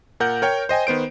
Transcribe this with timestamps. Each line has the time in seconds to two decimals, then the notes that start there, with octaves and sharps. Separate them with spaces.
0.20 A#2 A#4 F#5 G6
0.42 A#4 C#5 G5
0.69 C5 D#5 G5 G#5
0.87 D#3 B3 C5 D7